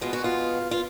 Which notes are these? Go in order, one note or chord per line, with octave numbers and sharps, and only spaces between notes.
B2 G#3 B3 F4
F#4
F4
F4